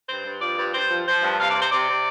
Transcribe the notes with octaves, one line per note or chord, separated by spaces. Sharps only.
G2 C5
G2
F3 D5
G2
G2 C5
F3
F3 C5
G2
C3 F5
D5
C3 C5
C3 D5
C3